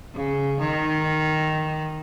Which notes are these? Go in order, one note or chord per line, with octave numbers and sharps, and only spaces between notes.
C#3
D#3